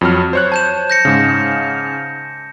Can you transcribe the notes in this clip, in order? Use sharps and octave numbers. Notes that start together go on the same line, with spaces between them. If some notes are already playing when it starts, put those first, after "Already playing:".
F2 F#3 F6
C5 C#5 F#6
A5 G6 E7
G6 A#6 C#7
G#2 C#3